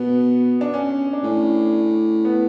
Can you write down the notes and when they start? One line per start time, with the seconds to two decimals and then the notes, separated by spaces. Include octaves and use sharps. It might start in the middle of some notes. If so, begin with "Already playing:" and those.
Already playing: B2 B3
0.61 D4
0.74 C#4
1.13 D4
1.24 A2 C#4
2.25 B3